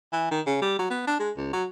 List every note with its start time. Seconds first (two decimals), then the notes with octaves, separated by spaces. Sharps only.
0.13 E3
0.31 D#3
0.47 C#3
0.62 G3
0.79 F#3
0.90 B3
1.07 D4
1.20 G#3
1.37 C#2
1.53 F#3